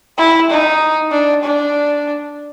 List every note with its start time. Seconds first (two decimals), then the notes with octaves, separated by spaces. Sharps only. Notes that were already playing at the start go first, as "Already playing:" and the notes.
0.18 E4
0.50 D#4
1.11 D4
1.43 D4